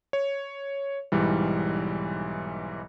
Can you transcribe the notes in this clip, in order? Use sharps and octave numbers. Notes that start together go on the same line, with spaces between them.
C#5
B1 G#2 E3 G3